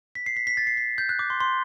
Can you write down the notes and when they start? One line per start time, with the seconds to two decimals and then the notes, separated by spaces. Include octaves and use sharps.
0.15 B6
0.26 C7
0.36 B6
0.47 B6
0.57 A6
0.67 C7
0.77 B6
0.98 G6
1.09 F#6
1.19 D6
1.30 C6
1.40 C6